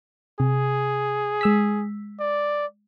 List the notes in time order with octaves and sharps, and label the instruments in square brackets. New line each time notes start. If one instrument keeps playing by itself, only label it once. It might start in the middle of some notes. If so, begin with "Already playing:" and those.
[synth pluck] C3 [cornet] G#4
[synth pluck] G#3 E6 B6
[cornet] D5